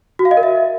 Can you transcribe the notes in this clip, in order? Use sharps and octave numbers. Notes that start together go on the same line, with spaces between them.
F#4
F5
D#5
A#4
E5